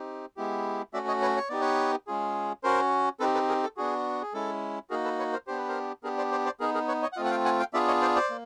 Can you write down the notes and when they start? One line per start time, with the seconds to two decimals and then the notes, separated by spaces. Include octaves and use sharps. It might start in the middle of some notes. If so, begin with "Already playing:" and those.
Already playing: C4 D#4 G4
0.37 G#3 B3 E4 G4
0.93 A3 C#4 F#4 D5 E5
1.08 C#5 D#5
1.22 B4 C#5
1.36 C#5
1.49 B3 D#4 G4 D5
1.61 B4 C#5
2.07 G#3 C#4 F4 G#4
2.63 C#4 F#4 A#4 C5
3.20 C4 D#4 G4 A4 B4
3.34 A4 B4
3.49 G#4 A#4
3.63 A4
3.77 B3 D4 F#4 G#4
4.22 G#4
4.34 G#3 C#4 E4 A4
4.90 A#3 D#4 F#4 G#4 A#4
5.04 A4 B4
5.19 B4 C#5
5.33 A#4 C5
5.47 B3 D4 G4 C5
5.58 B4
5.68 A#4 C5
6.03 B3 D4 G4 G#4 A#4
6.18 C5 D5
6.31 C5 D5
6.45 C5 D5
6.60 B3 D#4 G#4 A#4
6.74 G#4 A#4
6.88 B4 C#5
7.02 C#5 D#5
7.13 F#5
7.16 A3 C4 F4 D#5 F5
7.25 F#5
7.31 F5 G5
7.45 F#5 G#5
7.59 F5 G5
7.74 B3 D4 F4 G#4 D5 E5
7.87 C#5 D#5
8.02 C5 D5
8.16 C5 D5
8.30 A#3